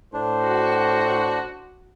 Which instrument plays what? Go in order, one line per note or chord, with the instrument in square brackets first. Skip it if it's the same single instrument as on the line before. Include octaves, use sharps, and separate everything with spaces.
[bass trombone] A2 [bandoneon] D4 [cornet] C5
[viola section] F#4